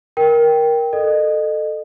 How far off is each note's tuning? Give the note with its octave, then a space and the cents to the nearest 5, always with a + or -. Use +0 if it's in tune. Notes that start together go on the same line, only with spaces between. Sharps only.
A#4 +15 G5 +0
A4 +0 D#5 -30